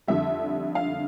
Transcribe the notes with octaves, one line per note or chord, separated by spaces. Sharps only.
F2 D3 G3 E5
F5